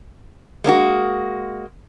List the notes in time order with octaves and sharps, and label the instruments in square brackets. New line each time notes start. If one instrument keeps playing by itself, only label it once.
[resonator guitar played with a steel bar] G#3 A#3 D4 F#4